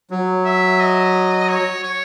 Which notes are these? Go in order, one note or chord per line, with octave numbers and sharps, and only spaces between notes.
F#3
E5
D#5
C#5
C#5